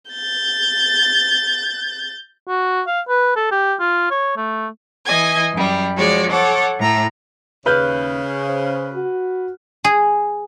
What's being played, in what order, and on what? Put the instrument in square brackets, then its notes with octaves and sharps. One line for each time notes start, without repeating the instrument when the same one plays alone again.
[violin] G6 A6
[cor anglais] F#4
F5
B4
A4
G4
F4
C#5
A3
[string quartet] E3 D#5 G#5 G#6
F#2 G3
F3 G#3 F#4 C#5 D5
A4 C#5 F#5 D6
A2 A#5 E6
[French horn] D#2 [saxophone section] C#3 [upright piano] B4 F6 G6
[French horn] C5
F#4
[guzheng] G#4